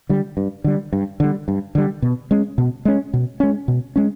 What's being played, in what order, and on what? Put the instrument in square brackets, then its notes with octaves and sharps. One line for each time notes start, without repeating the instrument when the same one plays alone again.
[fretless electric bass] D3 G3
G2
D3 G3
G2
D3 G3
G2
D3 G3
B2
G#3 C#4
B2
G#3 C#4
B2
G#3 C#4
B2
G#3 C#4